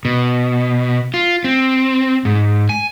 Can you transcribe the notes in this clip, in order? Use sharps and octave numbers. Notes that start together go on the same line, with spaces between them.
B2
F4
C4
G#2
G#5